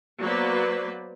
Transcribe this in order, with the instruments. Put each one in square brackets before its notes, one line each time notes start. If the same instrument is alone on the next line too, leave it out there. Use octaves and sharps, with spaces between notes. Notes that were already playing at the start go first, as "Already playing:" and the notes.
[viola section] F#3 A#3 B3 B4 C5 D5